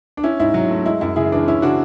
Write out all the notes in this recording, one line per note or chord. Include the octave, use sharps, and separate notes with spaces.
D4
C#4 E4
G#2 E4
F#3
A3
G#3 E4
F#2 E4
C#3 E4 G#4
E3 D4
C#4 E4
C#3 D4 F#4